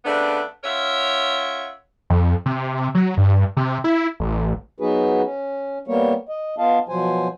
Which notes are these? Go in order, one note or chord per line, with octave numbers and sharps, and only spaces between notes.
C#3 A3 B3 C4 D4
C#4 F4 A#4 C#5 E5 F#5
F2
C3
F#3
G2
C3
E4
A1
F#3 B3 D#4 F#4 G#4 B4
C#4
G3 A#3 B3 C#5
D#5
B3 F4 D#5 F5 A5
B2 F3 F#3 C5 G#5